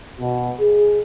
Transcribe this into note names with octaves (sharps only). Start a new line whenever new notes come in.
B2
G#4